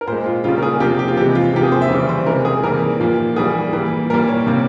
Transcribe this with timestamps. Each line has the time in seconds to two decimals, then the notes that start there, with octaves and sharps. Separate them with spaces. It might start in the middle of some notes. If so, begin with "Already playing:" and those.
0.01 A#4
0.07 A#2 C5
0.12 G#3
0.26 F4
0.44 C#3 G3 A#3 F4
0.58 A#4
0.63 G#4
0.80 C3 F3 A#3 G4
0.99 G4
1.08 F4
1.17 C3 E3 G#3 G4
1.35 F4
1.53 C3 F3 A#3 G4
1.63 G#4
1.72 C5
1.82 E5
1.90 C#3 E3 G3
2.09 C5
2.27 C3 E3 G#3 A#4
2.45 G#4
2.63 C3 E3 G3 A#3 A#4
3.00 A#2 F3 A#3
3.36 E3 G3 A#3 G#4
3.73 E3 G3 A#3
4.09 A#2 G3 A#3 A#4
4.28 C#5
4.46 C3 G3 A#3